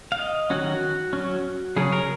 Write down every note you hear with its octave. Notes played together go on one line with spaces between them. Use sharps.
F5
D#5
D#3 F#3 C#4 F#4
F#3 C#4
C#3 F#3 C#4 G#4
A#4